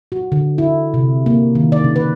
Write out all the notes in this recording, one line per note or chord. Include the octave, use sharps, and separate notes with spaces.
F#4
D3
E4
C3
A#3
D#3
D5
C#3
B4